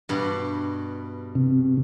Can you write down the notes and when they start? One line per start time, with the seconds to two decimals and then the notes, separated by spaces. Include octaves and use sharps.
0.09 G2 B2
1.35 C3